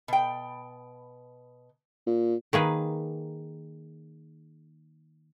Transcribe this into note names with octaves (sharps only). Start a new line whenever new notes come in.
B2 G5
A#2
D#3 A#3 G#4 B4